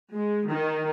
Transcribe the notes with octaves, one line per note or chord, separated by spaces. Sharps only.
G#3
D#3